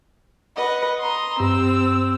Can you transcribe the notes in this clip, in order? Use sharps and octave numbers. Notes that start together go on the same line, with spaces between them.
B4 D#5 F#5
A#5 C6 D#6
G2 C4 E6